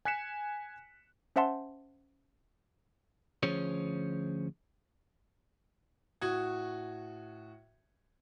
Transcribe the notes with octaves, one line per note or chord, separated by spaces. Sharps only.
G#5 F#6 B6 C#7 E7
C#4 C5 E5 F#5 A5 C6
D2 F3 C#4 G#4 C5 C#5
A2 F#4 D#6 G#6